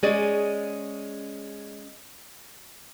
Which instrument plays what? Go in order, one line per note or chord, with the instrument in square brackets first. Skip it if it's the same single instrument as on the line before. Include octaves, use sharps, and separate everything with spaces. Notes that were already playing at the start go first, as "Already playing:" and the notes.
[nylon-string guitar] G#3 C#4 G#4 D5 D#5